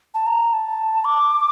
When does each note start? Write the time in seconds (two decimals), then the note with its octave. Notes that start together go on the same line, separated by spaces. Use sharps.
0.14 A5
0.26 A#5
0.53 A5
1.04 D6